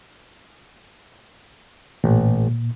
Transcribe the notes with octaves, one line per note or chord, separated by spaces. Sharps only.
A1 A#2